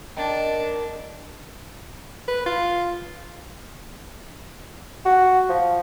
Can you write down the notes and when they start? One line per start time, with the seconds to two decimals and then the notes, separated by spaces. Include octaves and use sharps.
0.17 D#3 D4 A5
2.28 B4
2.46 F4
5.06 F#4
5.49 F3